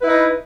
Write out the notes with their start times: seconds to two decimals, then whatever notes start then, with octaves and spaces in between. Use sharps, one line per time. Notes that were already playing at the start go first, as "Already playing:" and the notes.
0.01 B4
0.04 E4
0.08 D#4